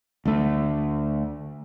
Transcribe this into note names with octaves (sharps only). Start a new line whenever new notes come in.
D2 A3